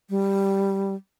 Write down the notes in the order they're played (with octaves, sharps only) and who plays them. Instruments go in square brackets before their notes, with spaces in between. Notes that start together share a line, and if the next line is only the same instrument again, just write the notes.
[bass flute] G3